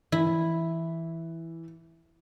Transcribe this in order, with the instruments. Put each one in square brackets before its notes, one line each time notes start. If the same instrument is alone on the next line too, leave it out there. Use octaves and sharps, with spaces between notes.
[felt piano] E3 [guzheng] E4